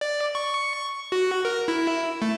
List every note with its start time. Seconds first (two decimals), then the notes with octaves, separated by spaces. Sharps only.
0.01 D5
0.35 C#6
1.12 F#4
1.45 A#4
1.68 E4
2.22 A3